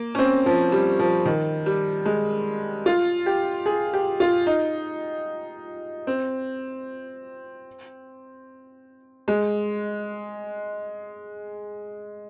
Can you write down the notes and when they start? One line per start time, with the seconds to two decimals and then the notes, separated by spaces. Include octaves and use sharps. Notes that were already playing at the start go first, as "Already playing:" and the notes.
Already playing: A#3
0.15 C#4
0.18 C4
0.46 F3
0.72 G3
0.99 F3
1.26 D#3
1.66 G3
2.05 G#3
2.86 F4
3.26 G4
3.66 G#4
3.93 G4
4.20 F4
4.47 D#4
6.07 C4
9.28 G#3